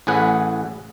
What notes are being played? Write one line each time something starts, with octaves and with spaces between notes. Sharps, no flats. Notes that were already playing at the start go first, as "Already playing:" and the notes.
A1 A2 G#4 B4 F#5